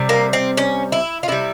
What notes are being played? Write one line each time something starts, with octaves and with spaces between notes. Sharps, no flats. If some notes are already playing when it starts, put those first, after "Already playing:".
Already playing: C3 G3
A#3
C4
C#4
E4
F4
C3 G3 E4